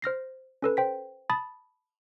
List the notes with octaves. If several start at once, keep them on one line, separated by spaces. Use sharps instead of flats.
C5 F6 A#6 C7
C#4 A4 B4
C5 G5 B6
A5 B5 D#6 A6